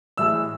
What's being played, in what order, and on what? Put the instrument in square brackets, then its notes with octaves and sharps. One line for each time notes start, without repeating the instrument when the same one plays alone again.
[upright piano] A2 E3 G#3 E6